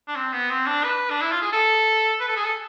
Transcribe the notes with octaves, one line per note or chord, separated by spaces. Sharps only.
D4
C4
B3
C4
D4
B4
D4
E4
F4
G#4
A4
B4
A4
G#4
A4